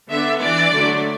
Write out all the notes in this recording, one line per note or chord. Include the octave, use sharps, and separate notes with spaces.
D3 B3 D4 E5
E3 D4 D5
D3 F#3 A3 D4